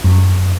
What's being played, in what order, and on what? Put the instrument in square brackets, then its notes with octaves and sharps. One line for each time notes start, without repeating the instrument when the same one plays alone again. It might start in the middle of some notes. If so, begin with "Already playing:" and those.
[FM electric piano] F#2